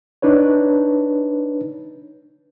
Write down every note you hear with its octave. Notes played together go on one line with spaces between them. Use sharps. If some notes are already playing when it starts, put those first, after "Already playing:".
D4 D#4 B4 C#5